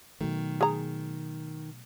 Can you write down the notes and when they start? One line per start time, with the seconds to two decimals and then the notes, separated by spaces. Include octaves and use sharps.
0.21 B2 D#3 F#3 A3
0.61 G#4 A#5